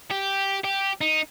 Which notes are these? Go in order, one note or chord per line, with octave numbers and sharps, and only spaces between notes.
G4
G4
D#4